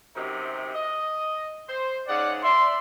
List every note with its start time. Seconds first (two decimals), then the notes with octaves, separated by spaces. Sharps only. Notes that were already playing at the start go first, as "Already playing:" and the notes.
0.15 F#2 C3 D#4
0.74 D#5
1.68 C5
2.08 G#2 C#3 D5 F#5
2.44 D5 E5 C6